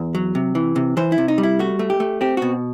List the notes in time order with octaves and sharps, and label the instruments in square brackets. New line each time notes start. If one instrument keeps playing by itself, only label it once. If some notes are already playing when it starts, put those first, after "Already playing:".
Already playing: [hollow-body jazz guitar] E2
F#3
C3
E3
C3
E3 C5
E4
C3
D#4
G3
E4
A3 F#4
A3
G4
A3
C4 G4
B2 F#4